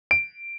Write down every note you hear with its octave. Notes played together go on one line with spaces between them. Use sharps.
D7